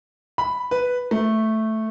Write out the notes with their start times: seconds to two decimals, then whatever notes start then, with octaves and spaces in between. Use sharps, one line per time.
0.38 B5
0.71 B4
1.11 A3